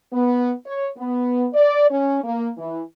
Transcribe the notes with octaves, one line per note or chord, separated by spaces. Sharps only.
B3
C#5
B3
D5
C#4
A#3
E3